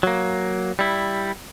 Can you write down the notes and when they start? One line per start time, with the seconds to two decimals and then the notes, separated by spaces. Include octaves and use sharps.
0.03 F#3 A#3
0.79 G3 E4